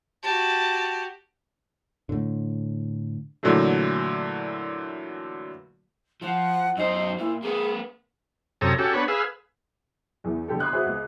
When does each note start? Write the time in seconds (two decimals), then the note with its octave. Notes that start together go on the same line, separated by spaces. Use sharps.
0.23 F#4 G4 A5
2.09 A2 D3
3.43 A#2 D3 E3 F#3 A3
6.22 F3 F#5
6.77 F#2 D#4 C5
7.18 A#2 E4
7.43 A#3 G#4 B4
8.61 F#2 C3 A4 C#5 A#5 D#6
8.78 C#4 F#4 G4 A4
8.94 B3 D4 B4 C#5
9.08 G#4 B4 F5 E6
10.24 E2 E3
10.48 A#1 D3 G4 A4
10.60 B5 C6 D6 D#6 F#6 G#6
10.73 F#4 G#4 B4 C5 E5 F#5
10.86 C#2